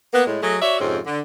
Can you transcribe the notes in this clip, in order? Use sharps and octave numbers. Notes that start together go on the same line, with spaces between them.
A#3 B3
A2 G#3
F#3 A3 G#4 D#5
F#4 C#5 D5 E5
F2 G#2 C3 C4 C#4
D3